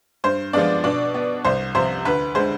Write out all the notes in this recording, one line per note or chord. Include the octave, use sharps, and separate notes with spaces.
G2 C5
F3 G#3 B3 D4 D5
B2 D4 D5
B3
C2 C5
C3 F3 C5
D2 B4
D3 G#3 C5